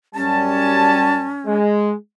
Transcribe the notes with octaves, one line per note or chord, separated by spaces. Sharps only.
F#2 G3 C#4 A5
G#3